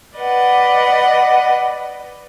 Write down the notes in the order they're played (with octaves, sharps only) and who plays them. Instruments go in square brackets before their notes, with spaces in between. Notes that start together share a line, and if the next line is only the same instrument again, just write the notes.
[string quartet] B4 D5 D#5 F#5